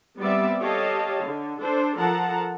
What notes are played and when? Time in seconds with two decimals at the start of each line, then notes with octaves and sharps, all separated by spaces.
0.20 G3 B3 C4 D5 E5
0.61 G4 A4 C#5 D#5 F5 A5
1.22 D3
1.60 D4 A4 C5
1.98 F3 A4 A#4 F#5 A5 A#5